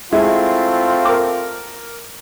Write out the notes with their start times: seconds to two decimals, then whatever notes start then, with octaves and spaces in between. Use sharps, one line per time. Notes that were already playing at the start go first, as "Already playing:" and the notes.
0.12 G#3 A3 C4 E4 F4 G#4
1.05 A#4 D6